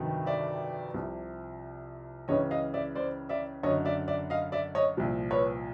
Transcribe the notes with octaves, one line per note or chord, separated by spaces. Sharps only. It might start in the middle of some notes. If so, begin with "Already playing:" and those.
Already playing: G1 F2 C3 D#3 F#3
D5 E5
C2 C3 F3
C#2 C#3 E3 C#5 D#5
D#5 F5
D5 E5
C5 D5
D5 E5
F#1 F#2 D3 C#5 D#5
D5 E5
D5 E5
D#5 F5
D5 E5
C#5 D#5
C2 A#2 F3
B4 C#5